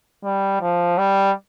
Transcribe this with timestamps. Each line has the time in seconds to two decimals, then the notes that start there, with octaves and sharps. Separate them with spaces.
0.24 G3
0.61 F3
0.98 G3